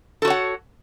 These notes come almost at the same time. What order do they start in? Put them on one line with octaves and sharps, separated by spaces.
A4 F#4 C#5 F#5